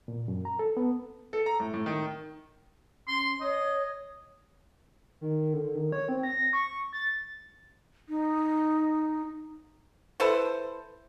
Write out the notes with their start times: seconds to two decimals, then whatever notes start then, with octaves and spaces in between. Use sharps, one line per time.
0.08 A#2
0.28 F#2
0.45 A#5
0.59 A4
0.77 B3
1.33 A4
1.46 A#5
1.60 A2
1.74 A2
1.86 D#3
3.08 C#4 C6
3.41 C#5 D#5
5.21 D#3
5.53 D3
5.75 D#3
5.92 C#5
6.09 C4
6.23 A#6
6.53 C#6
6.93 A6
8.09 D#4
10.20 E4 A4 B4 C5